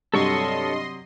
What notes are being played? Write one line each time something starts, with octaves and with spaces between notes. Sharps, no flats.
G2 C3 F#3 A4 C#5 D#5 C6 C#6